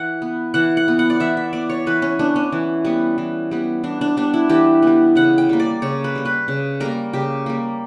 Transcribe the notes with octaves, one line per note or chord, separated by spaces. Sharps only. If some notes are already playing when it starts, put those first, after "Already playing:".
Already playing: E3 F#5
B3
E3 F#5
F#5
B3
F#5
D5
E3 E5
E5
B3 D5
C#5
E3 B4
C#4
B3 D4
C#4
E3
G3 B3
E3
G3 B3
E3 D4
D4
G3 B3 D4
E4
E3 G4
G3 B3
C#3 F#5
G5
G3 A#3
D5
C#3 C#5
B4
G3 A#3
B4
C#3
G3 A#3 A#4
C#3 G4
G3 A#3